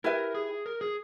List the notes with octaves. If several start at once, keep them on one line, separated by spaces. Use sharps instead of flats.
E4 G4 A#4 B4 E5
G#4
A#4
G#4